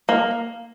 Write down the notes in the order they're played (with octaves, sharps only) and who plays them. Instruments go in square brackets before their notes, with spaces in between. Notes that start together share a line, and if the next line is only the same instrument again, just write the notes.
[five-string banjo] A#3